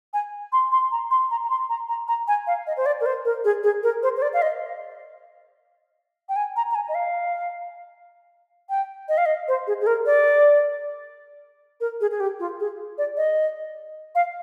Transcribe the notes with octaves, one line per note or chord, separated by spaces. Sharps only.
G#5
C6
C6
A#5
C6
A#5
A#5
C6
A#5
A#5
A#5
G#5
F5
D#5
C5
D5
A#4
C5
A#4
G#4
G#4
A#4
C5
C5
D5
F5
D#5
G5
G#5
A#5
A#5
G#5
D#5
F5
G5
D#5
F5
D#5
C5
G#4
G#4
A#4
D5
A#4
G#4
G#4
G4
F4
G#4
D5
D#5
F5